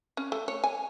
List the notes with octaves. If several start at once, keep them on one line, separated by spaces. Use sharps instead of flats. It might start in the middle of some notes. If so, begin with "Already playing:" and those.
C#4
A3
C#5
G#5